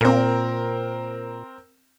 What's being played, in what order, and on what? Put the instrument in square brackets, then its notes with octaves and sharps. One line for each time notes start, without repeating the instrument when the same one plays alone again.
[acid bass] A#2 [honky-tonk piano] C4 A#4